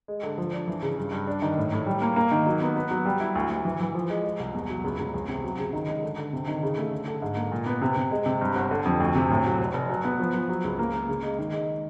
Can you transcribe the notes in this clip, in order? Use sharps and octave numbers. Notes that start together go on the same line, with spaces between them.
G#3
D3
F3
D4
E3
C#3
G2
G2
D4
D#3
A2
A2
G3
A#3
A#3
D#3
F#3
B3
B3
F#3
G3
E4
D2
D2
E3
E3
F3
G#3
G#3
C2
E2
F#3
C#2
C#2
E2
C3
F#3
C#3
D#3
G#3
D3
D3
C3
D#3
C#3
A3
D3
D3
G#2
A#3
A#2
B3
C3
C3
G#3
C3
G2
G1
D3
F2
D2
C3
A2
F#3
F1
F1
F#3
B3
F3
F3
F#3
C#2
A#3
A#3
C#3
G#3
D#3
G#3